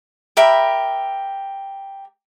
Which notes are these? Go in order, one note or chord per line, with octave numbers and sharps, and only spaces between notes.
G4 A#4 E5 B5